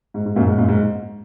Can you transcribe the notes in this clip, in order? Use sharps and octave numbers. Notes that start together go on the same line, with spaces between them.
G#2
G#2
F#2 A#2
G#2
F#2 A#2
G#2